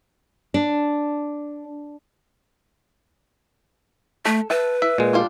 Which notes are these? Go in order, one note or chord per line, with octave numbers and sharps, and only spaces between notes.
D4
A3 A4
B4 E5 A5
E4 E5
A#2 G#3
G3 D4 F4